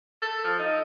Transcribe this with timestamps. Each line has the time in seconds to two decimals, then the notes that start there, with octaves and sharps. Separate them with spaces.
0.22 A4
0.44 F3
0.59 D#4